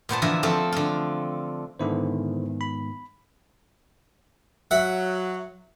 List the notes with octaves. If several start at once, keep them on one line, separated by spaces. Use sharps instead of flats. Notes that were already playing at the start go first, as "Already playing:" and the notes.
A#2 B3 C5 A5
D3 E3 F3 E5 A#5
F3 A3 C4 A4
D3 F4
G#2 D3 D#3 B3 E4 C5
B5
F#3 E5 F#5